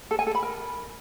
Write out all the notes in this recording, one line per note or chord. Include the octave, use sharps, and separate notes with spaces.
A4
G#5
A4
B5
A#4